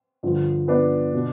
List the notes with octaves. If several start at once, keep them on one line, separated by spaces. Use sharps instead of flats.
G2 D3 F3
B3 D4
B2